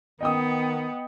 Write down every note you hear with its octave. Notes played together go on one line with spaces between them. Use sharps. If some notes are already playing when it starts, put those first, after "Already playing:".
D#3 B3 D#5 G5 D#6